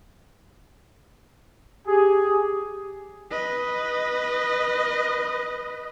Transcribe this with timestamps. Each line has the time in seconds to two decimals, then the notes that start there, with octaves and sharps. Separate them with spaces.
1.87 G4 G#4
3.30 B4 D#5